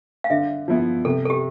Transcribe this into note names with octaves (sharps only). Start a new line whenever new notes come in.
F5
D3 E5
F3 B3 E4
C3 A4
A4
G4